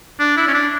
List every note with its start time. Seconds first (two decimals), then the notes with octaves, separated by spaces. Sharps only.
0.20 D4
0.37 E4
0.48 C#4
0.54 D4